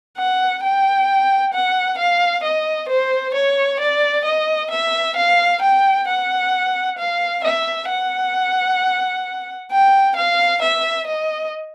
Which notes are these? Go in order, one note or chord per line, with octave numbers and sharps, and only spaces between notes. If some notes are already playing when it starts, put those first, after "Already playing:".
F#5
G5
F#5
F5
D#5
C5
C#5
D5
D#5
E5
F5
G5
F#5
F5
E5
F#5
G5
F5
E5
D#5